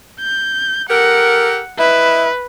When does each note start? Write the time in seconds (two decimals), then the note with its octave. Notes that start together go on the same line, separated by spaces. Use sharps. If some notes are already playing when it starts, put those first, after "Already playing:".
0.20 G6
0.89 G4 A4 A#4 F#5
1.79 E4 B4 D#5 E5